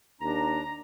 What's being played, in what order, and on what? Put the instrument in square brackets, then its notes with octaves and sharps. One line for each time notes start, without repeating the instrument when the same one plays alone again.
[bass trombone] D#2 [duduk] D4 [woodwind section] A#5